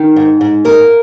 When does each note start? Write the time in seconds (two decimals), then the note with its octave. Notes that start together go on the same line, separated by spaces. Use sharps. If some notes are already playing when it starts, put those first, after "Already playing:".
Already playing: D#3
0.16 G#2
0.41 G#2
0.65 A#3 A#4